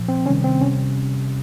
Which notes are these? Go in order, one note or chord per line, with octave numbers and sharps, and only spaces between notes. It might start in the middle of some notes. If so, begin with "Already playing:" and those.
Already playing: A#2 F3
C4
C3 D#3 G3 C#4
C4
C3 G3 C#4